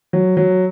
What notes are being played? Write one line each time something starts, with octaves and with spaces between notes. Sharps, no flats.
F#3
F#3